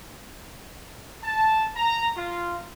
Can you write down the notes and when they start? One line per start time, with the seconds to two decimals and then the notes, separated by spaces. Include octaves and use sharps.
1.24 A5
1.76 A#5
2.17 F4